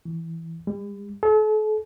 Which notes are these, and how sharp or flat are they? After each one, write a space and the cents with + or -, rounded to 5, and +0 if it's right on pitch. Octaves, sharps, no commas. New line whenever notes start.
E3 +0
G3 +45
A4 -40